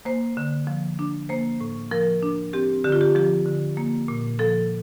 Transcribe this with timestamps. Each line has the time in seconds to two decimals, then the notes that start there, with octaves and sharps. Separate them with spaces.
0.05 A#3 C5
0.37 D3
0.67 F3
0.99 D4
1.29 A#3 C5
1.61 A2
1.91 F3 A#4
2.23 D4
2.53 C4 G4
2.84 D3 G4
2.92 F4
3.01 G4
3.15 F3 G4
3.46 D3
3.77 A#3
4.08 A#2
4.39 F3 A4